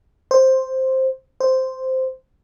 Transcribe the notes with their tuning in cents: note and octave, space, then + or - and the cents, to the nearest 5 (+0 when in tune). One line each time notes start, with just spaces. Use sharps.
C5 +5
C5 -5